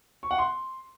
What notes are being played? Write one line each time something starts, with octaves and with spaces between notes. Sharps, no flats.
C#6
F#5
C6